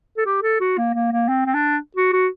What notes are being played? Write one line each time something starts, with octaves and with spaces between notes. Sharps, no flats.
A4
G4
A4
F#4
A#3
A#3
A#3
C4
C4
D4
F#4
F#4